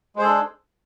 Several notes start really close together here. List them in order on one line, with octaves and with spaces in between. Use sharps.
G#3 C5 G#4 A4 D4